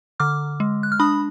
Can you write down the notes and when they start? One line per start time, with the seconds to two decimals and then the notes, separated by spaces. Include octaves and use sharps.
0.20 D3 D6 F6
0.60 G#3
0.83 F#6
0.92 F6
1.00 D4 B5 D#6